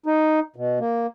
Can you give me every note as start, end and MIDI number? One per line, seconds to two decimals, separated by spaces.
0.06 0.40 63
0.56 0.79 47
0.79 1.07 58